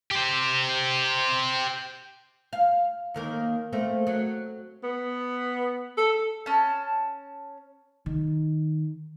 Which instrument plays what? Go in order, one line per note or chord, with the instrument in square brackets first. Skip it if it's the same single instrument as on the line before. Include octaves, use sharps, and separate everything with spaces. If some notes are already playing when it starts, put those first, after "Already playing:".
[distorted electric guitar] G4 C5
[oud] F5
D#2 D#3 A#3
A3 A#3 C4
F#3
[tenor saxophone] B3
A4
[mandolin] C#4 A5
[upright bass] D#3